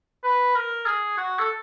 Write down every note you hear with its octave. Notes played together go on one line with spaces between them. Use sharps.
B4
A#4
G#4
F#4
A4